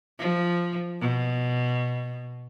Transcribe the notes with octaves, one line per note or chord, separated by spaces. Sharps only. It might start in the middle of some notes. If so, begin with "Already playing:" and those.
F3
B2